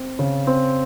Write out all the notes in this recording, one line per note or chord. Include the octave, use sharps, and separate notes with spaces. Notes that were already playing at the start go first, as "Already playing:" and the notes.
Already playing: C4
C#3
C4